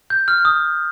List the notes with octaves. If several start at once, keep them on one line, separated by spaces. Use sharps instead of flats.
G6
F6
D#6